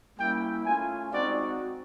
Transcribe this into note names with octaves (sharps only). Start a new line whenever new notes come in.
G3 A#3 C#4 E4 G5
A3 C#4 F4 G#5
G#3 C4 D#4 F#4 D5